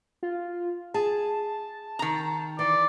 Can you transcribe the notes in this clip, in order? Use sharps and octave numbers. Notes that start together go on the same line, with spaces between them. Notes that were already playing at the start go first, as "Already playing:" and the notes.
F4
G#4 A5
D#3 A#5
E3 D5